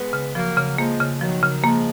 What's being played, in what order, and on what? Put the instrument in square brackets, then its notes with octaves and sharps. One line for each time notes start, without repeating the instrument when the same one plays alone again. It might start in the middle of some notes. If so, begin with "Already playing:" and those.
Already playing: [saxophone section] G#3 B3
[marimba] C#3
[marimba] F3 [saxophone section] F#3 A#3
[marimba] C#3
[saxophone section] F3 G#3 [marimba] A#3
[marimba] C#3
[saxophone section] D#3 F#3 [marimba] F3
[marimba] C#3
[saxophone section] F3 G#3 [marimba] A#3